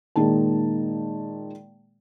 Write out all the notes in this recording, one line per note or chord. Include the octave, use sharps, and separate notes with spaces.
A#2 D#3 G#3 A5